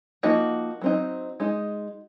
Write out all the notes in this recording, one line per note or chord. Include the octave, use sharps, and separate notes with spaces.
F3 A#3 D#4 F#4
F#3 C4 D#4
G#3 D#4